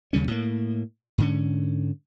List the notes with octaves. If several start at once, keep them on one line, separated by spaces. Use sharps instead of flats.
D#2 C#3 G3 C#4
A2 A#3
G#2 D3 C#4